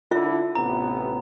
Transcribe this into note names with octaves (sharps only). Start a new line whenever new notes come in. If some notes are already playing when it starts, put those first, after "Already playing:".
D3 D4 E4 F4 E5
A1 C3 B3 A#5